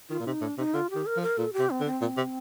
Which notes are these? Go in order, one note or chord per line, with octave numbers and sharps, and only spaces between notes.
D#3 F4
A#2
C3 D#4
A2 D4
C3 D#4
D3 F4
D#3 G4
A#4
F3
A#4
A#2 A4
G4
C3
C4
D3
C4
A#2
C3